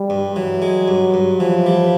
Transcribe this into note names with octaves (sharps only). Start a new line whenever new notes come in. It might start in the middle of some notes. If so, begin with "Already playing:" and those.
Already playing: G3
G2
E3 F#3
G#3
G2
G2
E3 F3
G3